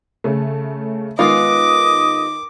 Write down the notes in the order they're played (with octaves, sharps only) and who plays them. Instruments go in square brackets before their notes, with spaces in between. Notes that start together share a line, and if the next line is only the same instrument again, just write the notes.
[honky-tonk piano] C#3 A3
[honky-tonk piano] D#3 [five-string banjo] G#3 B3 F4 [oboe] D#5 [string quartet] D6